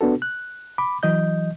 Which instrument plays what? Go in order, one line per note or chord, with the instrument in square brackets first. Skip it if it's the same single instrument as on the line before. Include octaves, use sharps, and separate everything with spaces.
[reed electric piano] B3 D4 F#4 A4
F#6
B5 D6
E3 F#3 D#5 G6